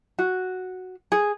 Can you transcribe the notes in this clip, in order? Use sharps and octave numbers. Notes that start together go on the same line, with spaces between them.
F#4
G#4